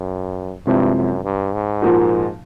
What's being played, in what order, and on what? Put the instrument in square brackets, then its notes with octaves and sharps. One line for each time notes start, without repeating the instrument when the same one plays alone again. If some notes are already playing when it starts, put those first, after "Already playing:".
Already playing: [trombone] F#2
[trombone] G2 [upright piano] C3 F3 G#3 C4 E4
[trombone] F#2
G2
G#2
[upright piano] A#2 F3 A#3 D#4 F#4